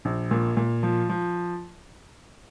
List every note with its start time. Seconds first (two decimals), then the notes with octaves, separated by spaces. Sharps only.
0.05 A#1
0.31 A#2
0.57 A#2
0.83 F3
1.09 F3